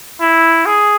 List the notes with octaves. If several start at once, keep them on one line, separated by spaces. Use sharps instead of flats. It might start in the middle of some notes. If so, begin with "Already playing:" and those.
E4
G#4